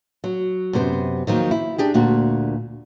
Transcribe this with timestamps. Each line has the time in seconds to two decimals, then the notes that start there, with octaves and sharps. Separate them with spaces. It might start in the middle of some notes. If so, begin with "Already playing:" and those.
0.24 F#3
0.73 F#2 C3 B3 C5
1.27 D#2 D#3 F3 F#3
1.51 E4
1.78 D4 G4 G#4
1.94 D2 A#2 F#4